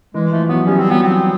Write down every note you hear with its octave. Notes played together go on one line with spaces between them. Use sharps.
E3 G#3
F3 A3
F#3 B3
G3 C#4
C4
F#3 B3
C4